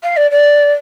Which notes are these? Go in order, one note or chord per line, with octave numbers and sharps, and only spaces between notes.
F5
D5
D5